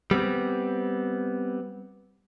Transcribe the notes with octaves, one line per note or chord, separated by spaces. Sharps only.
G3 B3 C4